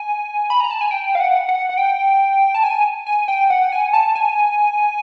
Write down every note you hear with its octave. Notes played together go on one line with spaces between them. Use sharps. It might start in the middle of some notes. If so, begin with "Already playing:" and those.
Already playing: G#5
B5
A#5
A5
G#5
G5
F5
F#5
F#5
F#5
G5
A5
G#5
G#5
G5
F#5
G#5
A5
G#5